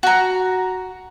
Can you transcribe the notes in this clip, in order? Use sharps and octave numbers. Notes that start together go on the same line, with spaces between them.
F#4 A#5